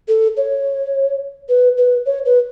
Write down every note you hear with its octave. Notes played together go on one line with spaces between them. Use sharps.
A4
C#5
B4
B4
C#5
B4